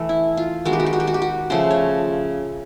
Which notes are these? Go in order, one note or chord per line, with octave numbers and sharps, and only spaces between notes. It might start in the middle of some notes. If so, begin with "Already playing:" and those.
Already playing: E3 A3
E4
F4
D#3 G#3 B3 F#4
G4
F#4
G4
F#4
G4
F#4
G4
F#4
C#3 F3 A3 C5
C#5